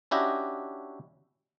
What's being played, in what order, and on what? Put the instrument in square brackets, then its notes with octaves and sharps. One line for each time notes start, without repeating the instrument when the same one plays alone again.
[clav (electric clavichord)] C#4 D4 E4 F#4 G4 D#5